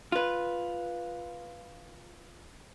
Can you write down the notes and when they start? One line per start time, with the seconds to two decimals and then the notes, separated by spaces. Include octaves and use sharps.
0.12 F4 B4